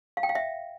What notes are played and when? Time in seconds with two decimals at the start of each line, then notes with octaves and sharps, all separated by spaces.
0.17 F5
0.23 G5
0.29 F5
0.35 E5